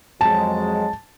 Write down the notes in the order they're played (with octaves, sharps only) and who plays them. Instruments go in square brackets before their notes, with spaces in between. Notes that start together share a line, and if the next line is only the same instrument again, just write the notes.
[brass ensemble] F2 F#3 G#3 [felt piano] A5